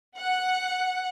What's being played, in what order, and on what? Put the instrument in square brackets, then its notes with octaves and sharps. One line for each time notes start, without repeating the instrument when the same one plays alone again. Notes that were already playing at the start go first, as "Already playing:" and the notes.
[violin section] F#5